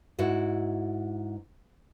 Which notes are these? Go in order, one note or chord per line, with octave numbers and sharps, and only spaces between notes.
G#2 E4 F#4